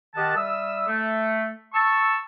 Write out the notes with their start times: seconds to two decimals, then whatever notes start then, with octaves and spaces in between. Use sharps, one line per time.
0.14 D#3 G4 D#5 F#5 A5
0.36 G3 E5 D#6 E6
0.87 A3
1.73 A5 C#6 E6